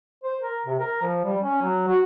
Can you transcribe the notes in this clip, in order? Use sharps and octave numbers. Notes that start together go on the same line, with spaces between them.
C5
A#4
C3
A#4
F3
G3
C#4
F#3
F#4